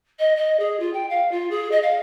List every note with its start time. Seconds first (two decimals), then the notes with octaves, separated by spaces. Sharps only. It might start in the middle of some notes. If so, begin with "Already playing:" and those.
0.19 D#5
0.36 D#5
0.59 G#4
0.79 F4
0.93 G5
1.09 F5
1.31 F4
1.50 G#4
1.71 D#5
1.82 F5